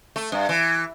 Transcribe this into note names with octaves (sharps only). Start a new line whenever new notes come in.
A3
G2
E3